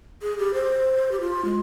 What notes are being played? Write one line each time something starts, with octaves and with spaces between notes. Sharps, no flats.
G#4
G4
C5
G4
F4
G#3